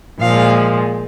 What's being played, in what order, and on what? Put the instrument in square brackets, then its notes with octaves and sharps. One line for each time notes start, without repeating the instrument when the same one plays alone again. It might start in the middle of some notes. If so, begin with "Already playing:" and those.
[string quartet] A#2 F3 G#3 F5